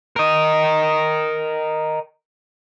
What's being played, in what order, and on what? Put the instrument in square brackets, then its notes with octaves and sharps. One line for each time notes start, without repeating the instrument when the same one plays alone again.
[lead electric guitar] A#4 D#5